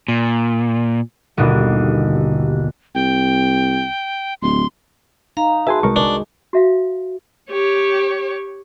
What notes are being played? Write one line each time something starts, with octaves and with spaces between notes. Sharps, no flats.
A#2
G1 D#2 B2 D3
C2 G5
D1 C6
D#4 F5 A#5
F#4 G#4 B4 E5 G#5 A5 C6
C2 G#3 A#4 C#6
D4 B4
F#4 E5 F5
G4 C#5